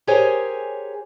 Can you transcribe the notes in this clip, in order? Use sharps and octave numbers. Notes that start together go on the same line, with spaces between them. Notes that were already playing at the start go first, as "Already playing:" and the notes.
G4 G#4 A#4 C5 C#5 G#5